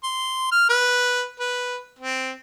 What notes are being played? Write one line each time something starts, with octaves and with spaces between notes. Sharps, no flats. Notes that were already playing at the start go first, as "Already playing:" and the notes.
C6
F6
B4
B4
C4